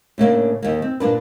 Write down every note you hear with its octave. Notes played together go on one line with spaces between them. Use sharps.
A2 C#3 A#3 D4
D#2 A#3
C4
A#2 A#3 D4 B4